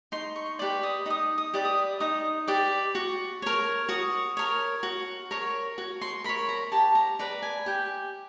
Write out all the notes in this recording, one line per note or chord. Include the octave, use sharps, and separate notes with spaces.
D#4 C6
C#6
G4 B4 D5 D6
D#6
D#4 D#6
D#6
G4 B4 D5
D#6
D#4 D#6
G4 B4 D5
F#4
A#4 C#5
F#4 D#6
A#4 C#5
F#4
A#4 C#5
F#4
C6
A#4 C#5 B5
A#5
G4 A5
A#5
B4 D5 A#5
G#5
G4 G5